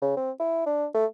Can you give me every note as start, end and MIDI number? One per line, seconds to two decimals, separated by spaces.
0.02 0.15 49
0.17 0.31 60
0.40 0.65 64
0.66 0.86 62
0.94 1.06 57